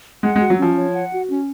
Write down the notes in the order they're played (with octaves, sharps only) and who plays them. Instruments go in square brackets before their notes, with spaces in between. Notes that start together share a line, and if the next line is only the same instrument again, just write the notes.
[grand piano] G#3 [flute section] F#5
[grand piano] G#3
[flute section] F#4
[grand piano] F#3
[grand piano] F3 [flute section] C#4
[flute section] C#5
F#5
F#4
C#4